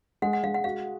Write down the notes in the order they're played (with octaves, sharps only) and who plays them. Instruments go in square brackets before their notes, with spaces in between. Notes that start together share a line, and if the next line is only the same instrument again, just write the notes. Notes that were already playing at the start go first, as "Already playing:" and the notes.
[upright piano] G#3 [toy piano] F#5
[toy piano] F#5
[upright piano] G#3 [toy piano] F5
[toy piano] F#5
[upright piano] F#4 [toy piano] F5